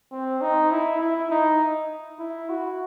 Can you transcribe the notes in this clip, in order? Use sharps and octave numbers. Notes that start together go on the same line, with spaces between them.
C4
D#4
E4
E4
D#4
E4
F#4